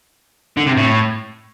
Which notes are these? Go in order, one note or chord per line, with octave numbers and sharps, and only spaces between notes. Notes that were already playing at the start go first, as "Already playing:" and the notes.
D3
C3
A2